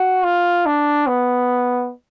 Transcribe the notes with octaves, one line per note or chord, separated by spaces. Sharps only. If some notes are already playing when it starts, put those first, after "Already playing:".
Already playing: F#4
F4
D4
B3